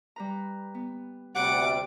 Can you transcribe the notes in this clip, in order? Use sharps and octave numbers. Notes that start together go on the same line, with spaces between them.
G3 B4 A#5
B3
D2 C3 G3 C4 G4 F#5 D6